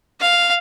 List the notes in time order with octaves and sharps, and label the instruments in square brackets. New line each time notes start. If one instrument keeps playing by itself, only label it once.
[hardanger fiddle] F5